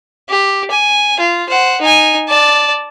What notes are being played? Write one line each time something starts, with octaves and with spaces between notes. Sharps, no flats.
G4
G#5
F4
C5 F#5
D#4 G#5
D5 A5